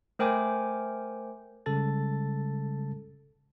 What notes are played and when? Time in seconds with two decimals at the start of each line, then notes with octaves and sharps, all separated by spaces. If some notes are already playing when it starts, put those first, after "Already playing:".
0.19 A3 A#4 C5 G5 G#5 D6
1.66 C#3 G3 G#3 A4 A5 A6